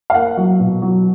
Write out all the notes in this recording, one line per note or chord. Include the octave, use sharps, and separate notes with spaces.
F5
A#3 F#5
F#3
B2
F#3